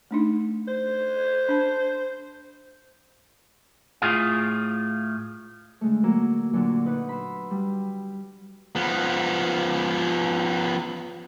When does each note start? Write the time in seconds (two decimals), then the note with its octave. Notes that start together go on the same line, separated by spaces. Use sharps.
0.11 A3 D4 D#4
0.68 C5
1.49 D4 A5
4.02 A2 F4 G#4 F5
5.81 D3 G#3 A3
6.04 F#3 A#3 A#5 E6
6.53 A#2 D3 F#3
6.85 D#4 B4 F#5
7.09 B5 C6 E6
7.51 G3
8.76 F3 B3